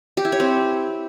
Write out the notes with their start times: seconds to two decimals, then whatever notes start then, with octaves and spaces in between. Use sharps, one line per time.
0.17 G4
0.25 E4
0.32 C#5
0.40 C4